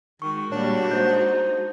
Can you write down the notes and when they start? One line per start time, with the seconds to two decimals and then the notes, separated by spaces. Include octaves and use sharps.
0.22 D#3 G#3 F#4 C#6
0.52 A#2 G3 D4 C#5
0.91 D#4 C5 G6